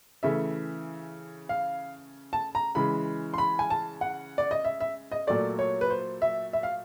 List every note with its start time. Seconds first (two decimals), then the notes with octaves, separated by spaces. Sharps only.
0.23 C#3 E3 A3 E5
1.49 F5
2.33 A5
2.55 A#5
2.75 C#3 E3 G#3 B5
3.34 C6
3.38 B5
3.59 G#5
3.70 A5
4.01 F#5
4.38 D5
4.51 D#5
4.65 E5
4.80 E5
5.12 D#5
5.27 A#2 F#3 A3 D5
5.59 C#5
5.81 B4
5.90 C5
6.22 E5
6.53 E5
6.63 F5